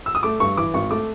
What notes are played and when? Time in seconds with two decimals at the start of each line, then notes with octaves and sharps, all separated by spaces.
0.06 E6
0.15 D#6
0.23 A3 D6
0.40 G2 C#6
0.57 E3 D6
0.74 G#1 C#6
0.91 A3 D6